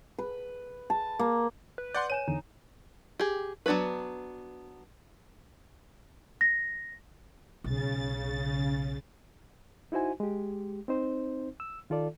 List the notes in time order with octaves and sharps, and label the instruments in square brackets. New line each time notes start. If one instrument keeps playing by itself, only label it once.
[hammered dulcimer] B4
A5
A#3
[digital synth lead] B4
[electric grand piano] D5 F#5 C6 [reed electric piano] G6
[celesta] C#5 G#5 E7 [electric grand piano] D#7
[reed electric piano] E2 D3 [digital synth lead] D#4
[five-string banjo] G4 G#4
F#3 B3 D4 F4 B4
[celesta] A#6
[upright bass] B1 [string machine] C#3 A6
[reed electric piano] D#4 E4 F#4 C5 G#5
G#3 G4
C4 D#4 C5
E6
D#3 F4 A4 D5